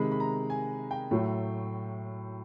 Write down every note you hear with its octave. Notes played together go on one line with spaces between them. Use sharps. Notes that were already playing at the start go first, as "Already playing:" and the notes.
Already playing: C3 D#3 G#3 B5
B5
A#5
G#5
G5
A2 F#3 A3